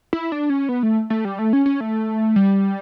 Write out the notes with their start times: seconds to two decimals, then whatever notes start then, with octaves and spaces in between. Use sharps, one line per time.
0.13 E4
0.32 D4
0.50 C#4
0.69 B3
0.83 A3
1.10 A3
1.25 G3
1.39 A3
1.53 C#4
1.66 C#4
1.80 A3
2.36 G3